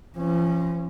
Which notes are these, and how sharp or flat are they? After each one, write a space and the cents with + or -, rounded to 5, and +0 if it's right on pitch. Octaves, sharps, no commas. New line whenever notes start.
F3 -40 C#4 -15